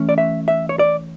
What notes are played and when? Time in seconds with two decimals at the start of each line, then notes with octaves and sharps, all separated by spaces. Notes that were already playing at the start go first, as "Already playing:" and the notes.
Already playing: E3 A3 C#4
0.09 D5
0.18 E5
0.48 E5
0.69 C#5
0.79 D5